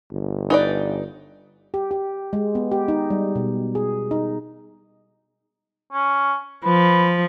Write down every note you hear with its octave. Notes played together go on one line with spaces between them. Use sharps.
G1
D#4 B4 D5
G4
G4
G#3
B3
G4
D#4
G3
B2
G#4
D#4
C#4
F3 B4